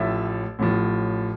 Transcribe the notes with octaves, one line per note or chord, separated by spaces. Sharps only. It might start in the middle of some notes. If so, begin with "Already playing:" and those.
Already playing: A1 A2 F3 E5
A1 A2 F3